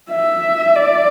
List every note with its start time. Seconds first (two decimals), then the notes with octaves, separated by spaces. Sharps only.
0.11 E5
0.76 D5